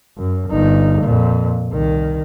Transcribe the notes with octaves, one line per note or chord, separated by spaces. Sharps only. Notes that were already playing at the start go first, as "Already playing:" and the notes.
F#2
G1 D#4
F2 A#2
C2 D#3